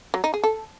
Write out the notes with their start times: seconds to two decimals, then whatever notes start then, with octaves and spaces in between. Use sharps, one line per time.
0.14 F#3
0.24 D#4
0.34 G#4
0.44 A4